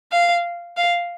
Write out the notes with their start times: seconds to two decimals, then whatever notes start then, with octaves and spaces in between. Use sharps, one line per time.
0.12 F5
0.77 F5